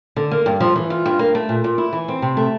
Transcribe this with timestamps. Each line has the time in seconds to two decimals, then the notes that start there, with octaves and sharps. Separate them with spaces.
0.16 D3
0.31 A#3
0.46 G2
0.60 F3
0.76 E3
0.90 F4
1.06 G2
1.19 A#3
1.35 A3
1.49 A#2
1.64 A#2
1.78 E4
1.93 E3
2.08 C4
2.22 C3
2.37 A3